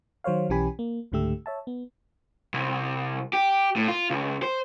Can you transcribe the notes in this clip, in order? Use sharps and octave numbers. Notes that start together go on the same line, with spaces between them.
D#3 F#3 C5 C#5 F5
B1 E3 C#4 G4 G#5 B5
A#3
C#2 G#2 D3 A3 G4 E6
C#5 E5 A5
B3
C2
G4
A2
F4
C#2
C5